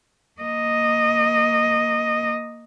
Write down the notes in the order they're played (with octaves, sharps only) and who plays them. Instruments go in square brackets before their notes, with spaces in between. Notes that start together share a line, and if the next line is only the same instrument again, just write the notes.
[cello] A#3 D#5